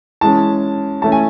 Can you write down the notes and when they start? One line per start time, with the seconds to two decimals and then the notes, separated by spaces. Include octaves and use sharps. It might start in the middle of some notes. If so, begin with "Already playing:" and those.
0.21 E3 G#3 C#4 A5
1.02 E3 A3 C#4 A5
1.12 G#5